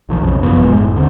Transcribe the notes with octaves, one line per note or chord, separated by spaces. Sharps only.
B1 A#2 D3 F3
B1 F2 C#3
G#1 F#2 F3 B3
D1 G2 B2 G#3
F#1 A2
D#2 D3 A#3 C4